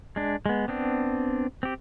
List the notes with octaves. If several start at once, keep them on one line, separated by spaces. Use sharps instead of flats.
G#3 D4
G#3 B3
B3 C4 D4
C4 G4